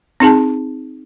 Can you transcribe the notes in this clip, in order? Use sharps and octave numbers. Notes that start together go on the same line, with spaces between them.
C4 D#4 G#4 A5